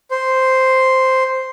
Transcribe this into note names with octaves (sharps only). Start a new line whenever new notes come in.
C5